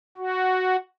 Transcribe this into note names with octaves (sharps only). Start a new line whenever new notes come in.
F#4